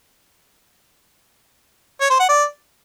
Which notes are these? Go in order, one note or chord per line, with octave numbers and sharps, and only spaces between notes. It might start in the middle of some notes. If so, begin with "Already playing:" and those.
C#5
C5
F#5
D5